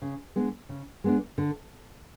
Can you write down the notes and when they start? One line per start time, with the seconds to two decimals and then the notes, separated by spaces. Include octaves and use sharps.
0.02 C#3
0.36 G#3 B3 D4
0.69 C#3
1.04 G#3 B3 D4
1.38 D3